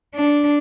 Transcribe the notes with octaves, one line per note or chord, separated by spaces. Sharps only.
D4